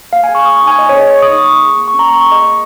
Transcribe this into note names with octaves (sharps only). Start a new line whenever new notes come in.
A#3 F5
G#5
G#4
C#6
A#3 D#6
C#6
D#4
G#5
A#3 D#5
C#5
G#4
D#5
A#3 C#6
D#6
D#4
C#6
A#3 C#6
G#4
A#3
C#6
C#4
A#5
A#3 C#6
C#6
G#4
D#5
A#3